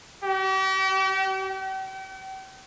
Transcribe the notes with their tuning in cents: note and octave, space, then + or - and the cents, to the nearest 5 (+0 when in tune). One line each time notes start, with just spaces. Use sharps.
G4 -40
G5 -45